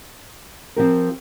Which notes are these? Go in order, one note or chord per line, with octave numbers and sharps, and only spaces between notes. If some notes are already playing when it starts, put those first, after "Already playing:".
F3 C4 G4 A#4